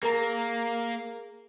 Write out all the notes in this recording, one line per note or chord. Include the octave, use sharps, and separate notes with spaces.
A#3 G#4 A#4 A#5